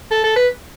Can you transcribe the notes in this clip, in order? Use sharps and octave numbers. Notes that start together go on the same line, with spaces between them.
A4
A4
B4